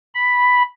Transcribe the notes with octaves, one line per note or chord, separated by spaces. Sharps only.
B5